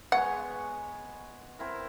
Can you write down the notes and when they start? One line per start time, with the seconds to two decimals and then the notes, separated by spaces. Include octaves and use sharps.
0.12 G#3 B3 C#5 F#5
1.59 C4 E4 A#4